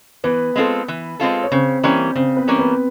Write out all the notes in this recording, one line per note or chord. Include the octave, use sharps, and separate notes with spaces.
E3 B3 B4
G#3 C4 F4 A4
E3
G#3 C4 F4 A4
C#5
C#3 C4 C5
E3 G3 A#3 C#4
C#3 C4 C5
B3 B4
E3 G3 A#3 C#4
B3 B4